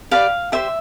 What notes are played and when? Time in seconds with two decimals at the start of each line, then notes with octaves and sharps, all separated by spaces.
0.11 G4 B4 D5 F5
0.52 G4 C5 E5